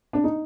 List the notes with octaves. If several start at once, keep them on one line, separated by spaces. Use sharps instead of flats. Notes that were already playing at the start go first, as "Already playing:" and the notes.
D4
D#4